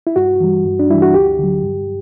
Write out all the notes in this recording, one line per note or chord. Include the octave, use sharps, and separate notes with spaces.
E4
G2 F#4
E3 G3
G2
D4
E3 G3 E4
F#4
D2 G4
D3 F#3
G2